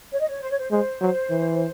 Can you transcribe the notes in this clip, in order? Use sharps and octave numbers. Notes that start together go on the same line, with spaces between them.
C#5
D#5
C#5
C5
C#5
C5
G#3 C5
F#3
E3